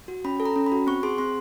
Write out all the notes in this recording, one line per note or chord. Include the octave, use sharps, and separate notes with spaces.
F#4
C#4 B5
A4
A#5
C#4
B5
F#4
C4 C#6
G#4 C6
C4 C6